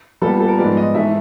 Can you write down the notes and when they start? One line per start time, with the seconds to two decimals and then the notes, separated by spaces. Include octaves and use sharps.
0.22 A#2 G3 B3 A4
0.40 A4
0.48 A#4
0.58 G#2 F3 G#3 B3 D5
0.77 D#5
0.94 G#2 E3 A3 E5